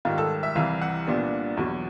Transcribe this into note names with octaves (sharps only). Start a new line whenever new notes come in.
G#2 D#3 G3 F4
A4
E5
C2 C3 E3 F5
F#5
C2 A#2 G3 B3 D4
E2 B2 F#3